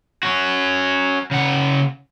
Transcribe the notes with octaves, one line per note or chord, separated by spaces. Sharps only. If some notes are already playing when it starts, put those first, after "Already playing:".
C#4 F#4
C#3 F#5